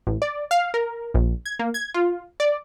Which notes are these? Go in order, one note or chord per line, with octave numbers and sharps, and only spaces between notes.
A1
D5
F5
A#4
A#1
G#6
A#3
G#6
F4
D5